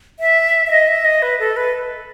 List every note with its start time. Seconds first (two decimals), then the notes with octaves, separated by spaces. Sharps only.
0.19 E5
0.67 E5
0.71 D#5
0.88 E5
1.05 D#5
1.22 B4
1.39 A4
1.57 B4